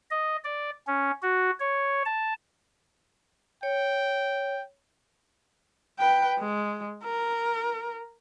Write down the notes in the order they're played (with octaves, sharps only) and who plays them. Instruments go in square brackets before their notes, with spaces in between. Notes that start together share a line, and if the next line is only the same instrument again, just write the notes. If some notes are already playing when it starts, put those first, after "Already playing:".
[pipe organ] D#5
D5
C#4
F#4
C#5
A5
[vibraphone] C#5 [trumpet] G5
[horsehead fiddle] B4 G5
G#3
A#4